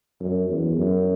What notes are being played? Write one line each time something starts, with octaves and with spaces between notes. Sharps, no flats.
F#2
E2
F#2